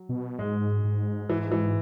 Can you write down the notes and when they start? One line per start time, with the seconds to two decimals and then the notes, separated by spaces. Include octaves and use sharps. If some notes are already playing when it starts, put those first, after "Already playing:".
Already playing: F#3
0.09 B2
0.39 G#2 G#3
0.84 G#2
1.29 G#2 E3
1.52 E3